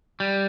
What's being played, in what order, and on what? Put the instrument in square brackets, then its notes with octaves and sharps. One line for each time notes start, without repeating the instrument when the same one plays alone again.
[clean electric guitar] G3